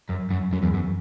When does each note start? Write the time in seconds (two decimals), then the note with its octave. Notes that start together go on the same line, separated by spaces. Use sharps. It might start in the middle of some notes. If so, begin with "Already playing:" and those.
0.09 F#2
0.31 F#2
0.53 F#2
0.63 E2
0.74 F#2